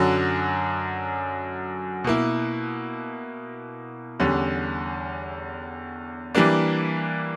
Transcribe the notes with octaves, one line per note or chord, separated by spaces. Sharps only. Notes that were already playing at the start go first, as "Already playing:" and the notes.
Already playing: F#2 D3 F#3
B2 A#3 E4
E2 D3 G3 C#4
E3 G3 A#3 D4